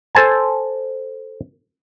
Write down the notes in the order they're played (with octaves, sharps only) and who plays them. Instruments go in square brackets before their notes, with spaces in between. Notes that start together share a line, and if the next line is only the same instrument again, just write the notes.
[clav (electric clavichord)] A4 C5 G#5 A5